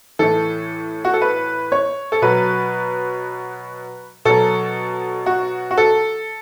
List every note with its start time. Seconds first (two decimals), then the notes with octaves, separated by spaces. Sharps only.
0.19 A2 E3 A4
1.05 F#4
1.14 A4
1.22 B4
1.72 C#5
2.12 A4
2.22 B2 F#3 B4
4.25 B2 F#3 A4
5.26 F#4
5.71 F#4
5.78 A4